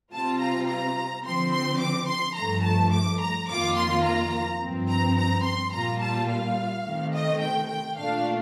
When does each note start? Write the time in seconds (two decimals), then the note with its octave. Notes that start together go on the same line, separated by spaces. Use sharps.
0.13 C3 G3 C4 F4 A5
0.40 A#5
0.68 A#5
1.25 D3 F3 C4 C6
1.52 C6
1.81 D6
2.08 C6
2.36 G2 F3 A3 A#5
2.64 A5
2.92 D6
3.21 A#5
3.48 F2 D#3 A#3 F4 D6
3.76 C6
4.04 A#5
4.61 G2 F3 C4
4.88 A#5
5.17 A#5
5.44 C6
5.72 A#2 G3 A#3 F4 A#5
6.01 A5
6.29 F5
6.85 C3 D#3 A3
7.13 D#5
7.41 G5
7.69 G5
7.97 A#2 A3 D4 F5